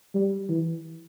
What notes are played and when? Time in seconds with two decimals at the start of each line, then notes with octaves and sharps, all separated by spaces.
0.14 G3
0.49 E3